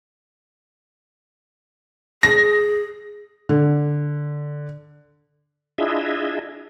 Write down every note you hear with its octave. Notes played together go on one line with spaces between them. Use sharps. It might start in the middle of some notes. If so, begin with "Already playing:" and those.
G#4 A#6
D3
D4 E4 F4 G#4 D#5 E5